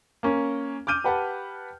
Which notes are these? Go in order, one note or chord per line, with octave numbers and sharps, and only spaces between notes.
A#3 C#4
D6 F6 G6 D#7
G4 B4 F#5 A5